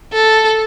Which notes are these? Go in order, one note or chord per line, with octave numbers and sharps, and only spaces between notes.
A4